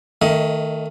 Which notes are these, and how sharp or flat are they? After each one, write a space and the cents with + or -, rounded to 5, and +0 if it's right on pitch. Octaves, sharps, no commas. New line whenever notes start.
D#3 +0 A3 +20 D#5 +30